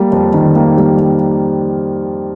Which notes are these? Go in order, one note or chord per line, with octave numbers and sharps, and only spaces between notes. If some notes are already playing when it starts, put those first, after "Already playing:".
Already playing: G3 A#3
F2
D#3
A#3
G3